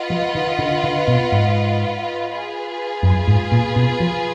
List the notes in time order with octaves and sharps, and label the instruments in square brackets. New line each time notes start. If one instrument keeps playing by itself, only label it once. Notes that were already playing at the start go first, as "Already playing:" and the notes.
Already playing: [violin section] F4 B4 D#5 F#5
[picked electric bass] F3
D#3
D3
D3
B2
G#2
[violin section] F4 G#4 B4
[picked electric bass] F#2
G#2
A#2
B2
F3